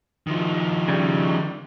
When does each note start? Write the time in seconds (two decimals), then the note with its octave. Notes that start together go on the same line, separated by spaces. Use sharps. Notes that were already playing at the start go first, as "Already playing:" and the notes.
0.27 D#3 F3
0.88 C#3 G3